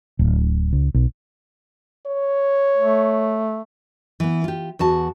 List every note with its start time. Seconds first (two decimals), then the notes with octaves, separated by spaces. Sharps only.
0.19 D1
0.73 C#2
0.94 B1
2.07 C#5
2.77 A3
4.20 E3 B3
4.44 F4 G4
4.79 E2 F#4 A5